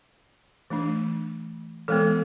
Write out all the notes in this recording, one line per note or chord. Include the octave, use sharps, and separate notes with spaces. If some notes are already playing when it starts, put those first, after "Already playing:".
E3 A3 D4
E3 G#3 B3 A4